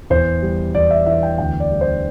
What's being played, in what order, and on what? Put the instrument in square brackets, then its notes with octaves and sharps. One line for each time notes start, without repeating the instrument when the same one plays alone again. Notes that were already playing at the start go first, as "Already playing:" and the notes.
[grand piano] E2 C5
G3
E2 D5
E5
E3 E5
G5
D2 G5
D5
G3
C5